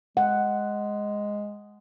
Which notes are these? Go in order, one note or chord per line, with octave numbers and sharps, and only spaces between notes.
G#3 F#5